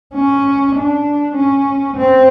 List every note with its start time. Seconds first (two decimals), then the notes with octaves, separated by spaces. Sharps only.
0.15 C#4
0.76 D4
1.36 C#4
1.97 C4